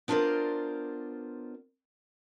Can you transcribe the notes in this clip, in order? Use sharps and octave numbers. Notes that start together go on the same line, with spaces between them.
B3 D4 F4 A#4 C5 D5